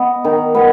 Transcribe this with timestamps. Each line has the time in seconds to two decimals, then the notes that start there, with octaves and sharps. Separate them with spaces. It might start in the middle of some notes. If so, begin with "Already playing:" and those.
Already playing: B3 D#5
0.24 D#3
0.55 B3